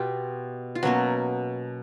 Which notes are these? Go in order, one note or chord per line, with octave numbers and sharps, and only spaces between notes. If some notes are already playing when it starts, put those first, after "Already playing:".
Already playing: B2 F4 G4
F4
B2 F#3 A#3 C#4 F#4